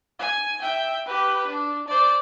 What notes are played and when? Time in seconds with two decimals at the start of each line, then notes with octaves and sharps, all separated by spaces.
0.19 G#5
0.62 E5 G5
1.06 G4 B4
1.47 D4
1.88 C5 D5